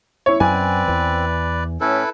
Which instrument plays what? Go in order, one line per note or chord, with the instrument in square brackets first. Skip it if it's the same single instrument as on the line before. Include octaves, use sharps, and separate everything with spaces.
[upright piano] E4 C#5
[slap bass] F#2 [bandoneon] C4 [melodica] B4 D5 [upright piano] G#5
[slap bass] E2 E3
[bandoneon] A2 C#4 [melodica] E4 A4 B4